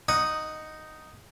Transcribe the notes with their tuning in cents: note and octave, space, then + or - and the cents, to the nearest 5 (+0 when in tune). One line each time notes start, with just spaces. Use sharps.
D#4 +0 F#5 +0 D#6 +0